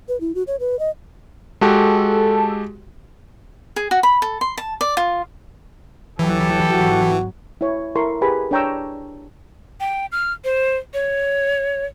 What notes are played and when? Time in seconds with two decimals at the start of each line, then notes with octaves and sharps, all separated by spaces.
0.08 B4
0.21 E4
0.35 F#4
0.47 C#5
0.60 B4
0.79 D#5
1.61 G#3 F#4 G4 A4
3.76 G#4
3.91 F#4
4.03 B5
4.22 A4
4.41 C6
4.58 A5
4.81 D5
4.97 F4
6.19 D2 E3 F#3 G4 A4
6.71 G#1 F#3 F#4
7.61 E4 C#5
7.96 E4 A4 A#4 C6 C#6
8.21 G4 G#4 B4 G#5 B5
8.51 D4 C#5 G5 A#5 C#6 E6
9.80 G5
10.12 F6
10.44 C5
10.94 C#5